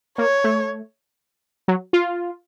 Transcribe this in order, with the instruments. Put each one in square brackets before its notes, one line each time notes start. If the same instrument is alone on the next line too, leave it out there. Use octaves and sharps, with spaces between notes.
[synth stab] A#3 [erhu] C#5
[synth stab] A3
F#3
F4